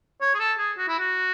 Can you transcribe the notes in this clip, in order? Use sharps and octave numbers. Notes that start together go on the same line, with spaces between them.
C#5
G#4
A4
G#4
F#4
E4
F#4